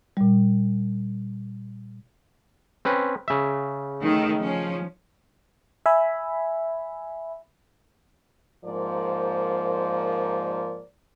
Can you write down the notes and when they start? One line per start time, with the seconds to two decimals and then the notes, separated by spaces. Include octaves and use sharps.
0.17 A#2 G3
2.85 C4 C#4 B4
3.28 C#3 E5
4.01 D#3 A3
4.40 F3 C#4
5.86 E5 G#5 B5
8.65 G#2 F3 A#3 A#4 C5 D5